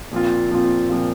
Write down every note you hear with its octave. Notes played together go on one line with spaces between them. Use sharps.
A#2 F3 C4 F4
A#2 F3 C4 F4
A#2 F3 C4 F4